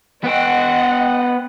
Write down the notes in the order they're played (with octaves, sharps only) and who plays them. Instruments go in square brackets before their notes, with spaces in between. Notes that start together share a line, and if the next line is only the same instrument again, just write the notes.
[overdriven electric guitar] B3 G5 [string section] D#5 F#5